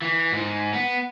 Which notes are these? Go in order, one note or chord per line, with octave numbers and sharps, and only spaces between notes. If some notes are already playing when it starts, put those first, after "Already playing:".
E3
G#2
B3